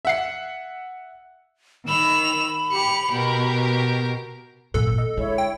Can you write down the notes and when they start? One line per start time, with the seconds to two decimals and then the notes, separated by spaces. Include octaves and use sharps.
0.05 E5 F#5 C7
1.88 D#3 B5 E6 F7
2.72 G4 C#7 F7
3.11 B2 G4 A#4
4.74 G#1 F#2 A#2 A4 F#6
4.98 D#5
5.17 D3 G#3 E4 C#5
5.38 G5